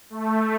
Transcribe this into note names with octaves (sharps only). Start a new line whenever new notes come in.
A3